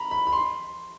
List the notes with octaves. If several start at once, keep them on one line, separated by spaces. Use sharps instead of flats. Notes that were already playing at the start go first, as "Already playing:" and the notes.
Already playing: A#5 B5
B5
B5
C6